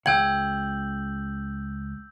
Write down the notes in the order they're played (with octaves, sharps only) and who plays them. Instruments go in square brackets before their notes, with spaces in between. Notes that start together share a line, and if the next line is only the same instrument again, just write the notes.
[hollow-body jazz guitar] C#2 F#5 [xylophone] G5 G#6 [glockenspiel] E6 G6 F#7